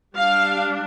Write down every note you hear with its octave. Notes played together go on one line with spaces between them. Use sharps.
G3 D4 F5